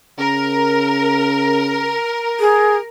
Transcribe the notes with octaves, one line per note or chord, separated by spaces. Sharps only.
C#3 A#4
G#4